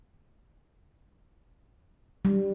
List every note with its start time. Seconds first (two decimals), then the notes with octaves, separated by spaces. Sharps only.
2.25 G3